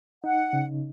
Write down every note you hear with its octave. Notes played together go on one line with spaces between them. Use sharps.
D#4 F#5
C#3